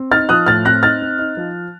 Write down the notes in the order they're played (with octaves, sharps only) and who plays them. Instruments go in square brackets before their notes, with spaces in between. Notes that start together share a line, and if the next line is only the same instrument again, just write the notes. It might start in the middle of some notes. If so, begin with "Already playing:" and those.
Already playing: [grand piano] C4
D#4 F6 A6
F3 D#6 F#6
A2 F6 A6
C4 F#6 A#6
D#4 F6 A6
C4
D#4
F3